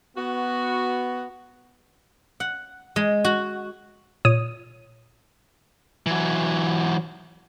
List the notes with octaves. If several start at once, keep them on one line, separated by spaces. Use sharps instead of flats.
B3 F#4
F#5
G#3
F#4
A#2 C#5 D#6 D#7
E3 F#3